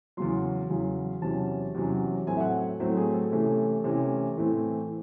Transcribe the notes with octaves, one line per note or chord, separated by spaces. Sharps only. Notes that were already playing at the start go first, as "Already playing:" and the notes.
E2 C#3 F#3 C6
E2 C#3 F#3
E2 C3 F#3 C#4 A5
E2 C3 F#3 C#4
A2 F#3 A3 C4 G#5
E5
F#5
A2 F#3 A3 C4 C5
G#4
A4
C3 E3 A3 C#4
C3 E3 A3 C#4
A2 E3 A3 C4